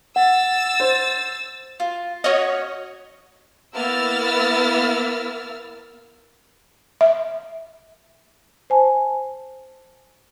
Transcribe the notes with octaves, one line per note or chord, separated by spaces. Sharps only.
F#5 E6 A6
C5
F4
C#4 F#4 C#5 D#5
A#3 B3 E4 E6 F6 A6
E5
C5 G#5 A5